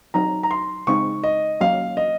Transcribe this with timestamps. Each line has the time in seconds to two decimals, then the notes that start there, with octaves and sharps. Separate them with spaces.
0.14 F#3 C4 D#4 A#5
0.43 A#5
0.51 C6
0.87 C#3 G#3 C4 D#4 C#6
1.24 D#5
1.61 F#3 A#3 C#4 F5
1.97 D#5